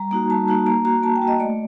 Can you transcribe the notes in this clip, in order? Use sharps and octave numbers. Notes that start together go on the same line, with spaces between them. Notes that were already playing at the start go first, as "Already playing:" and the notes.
Already playing: G3 A#5
A#3 D#4 F#4 A#5
G3 A5
A#3 D#4 F#4 A5
A#3 A#5
F#4 A#5
A#3 A5
G5
F#4
D#5
A3 D5